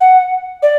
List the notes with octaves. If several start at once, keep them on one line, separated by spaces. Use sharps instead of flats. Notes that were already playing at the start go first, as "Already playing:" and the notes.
F#5
D5